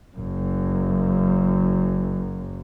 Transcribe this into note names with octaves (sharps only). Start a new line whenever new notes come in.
F#1 F#2